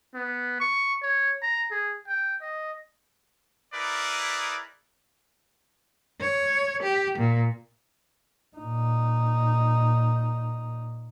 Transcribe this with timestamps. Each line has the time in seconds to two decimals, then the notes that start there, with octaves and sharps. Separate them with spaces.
0.14 B3
0.60 C#6
1.02 C#5
1.42 A#5
1.71 G#4
2.07 G5
2.41 D#5
3.74 D#4 E4 G#4 A#4 B4 D5
6.21 C#5
6.83 G4
7.18 A#2
8.57 A#2 D#4